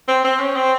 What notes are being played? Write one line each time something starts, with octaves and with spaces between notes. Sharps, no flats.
C4
C4
C#4
C4